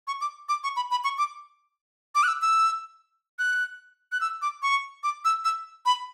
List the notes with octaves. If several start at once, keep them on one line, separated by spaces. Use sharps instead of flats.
C#6
D6
D6
C#6
B5
B5
C#6
D6
D6
F#6
E6
E6
F#6
F#6
E6
D6
C#6
D6
E6
E6
B5